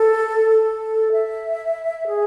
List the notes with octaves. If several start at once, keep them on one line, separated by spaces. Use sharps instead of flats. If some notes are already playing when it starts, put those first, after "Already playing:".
Already playing: A4
A4
E5
G#4